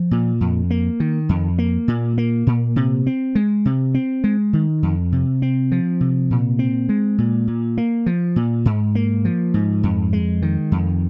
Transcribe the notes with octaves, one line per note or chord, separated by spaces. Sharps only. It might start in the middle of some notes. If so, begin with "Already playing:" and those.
Already playing: F3
A#2
F2
A#3
D#3
F2
A#3
A#2
A#3
A#2
C3
C4
G#3
C3
C4
G#3
D#3
F2
C3
C4
F3
C3
A#2
C4
G#3
A#2
A#2
A#3
F3
A#2
G#2
A#3
F3
G#2
F2
G#3
D#3
F2